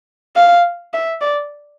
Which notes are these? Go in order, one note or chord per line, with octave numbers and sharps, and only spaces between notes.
F5
E5
D5